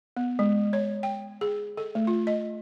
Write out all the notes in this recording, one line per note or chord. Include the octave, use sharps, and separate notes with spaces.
B3
G#3
C#5
G5
G#4
A4
A3
F4
D#5